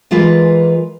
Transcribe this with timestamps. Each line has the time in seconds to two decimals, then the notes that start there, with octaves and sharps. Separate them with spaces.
0.11 E3 G#3 F4 A#4 B4